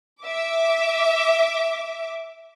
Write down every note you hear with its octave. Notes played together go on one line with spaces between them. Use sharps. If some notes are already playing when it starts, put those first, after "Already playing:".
E5 D6